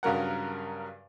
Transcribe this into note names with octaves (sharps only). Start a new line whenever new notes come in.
G2 C#3 F#3 A#4 F#5